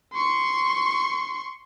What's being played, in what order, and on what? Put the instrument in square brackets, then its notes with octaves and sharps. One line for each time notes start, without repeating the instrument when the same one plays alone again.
[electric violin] C6 C#6